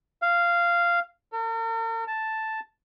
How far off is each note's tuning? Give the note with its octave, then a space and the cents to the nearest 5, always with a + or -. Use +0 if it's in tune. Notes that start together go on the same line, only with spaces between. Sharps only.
F5 -10
A#4 -45
A5 +0